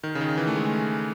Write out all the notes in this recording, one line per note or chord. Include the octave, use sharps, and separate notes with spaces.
D#3
C#3
D#3
E3
A3
G#3